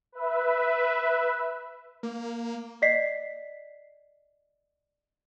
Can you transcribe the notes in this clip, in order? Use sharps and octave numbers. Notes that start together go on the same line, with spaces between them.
B4 E5
A#3
D5 D#5 B6 C7